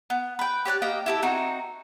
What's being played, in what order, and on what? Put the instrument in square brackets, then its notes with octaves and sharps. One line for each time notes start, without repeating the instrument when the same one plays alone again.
[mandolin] B3
B4 G5
G4 C#5 D5 F#6
A#3 G4 D#5 G5
E4 G4 A4
C4 D#4 F#4